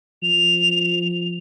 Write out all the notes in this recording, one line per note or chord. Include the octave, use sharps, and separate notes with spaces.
F3 F7